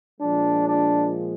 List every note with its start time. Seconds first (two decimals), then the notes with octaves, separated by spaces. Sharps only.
0.21 A#2 F3 G#3 D4
0.68 D4